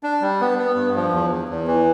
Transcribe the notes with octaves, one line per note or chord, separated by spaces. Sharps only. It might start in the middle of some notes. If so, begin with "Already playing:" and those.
D4
G3
B3
B3
G2
F3
E2
E2
E2
E3